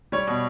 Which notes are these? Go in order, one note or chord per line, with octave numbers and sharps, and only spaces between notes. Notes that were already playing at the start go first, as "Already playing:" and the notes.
G3 C#5
B2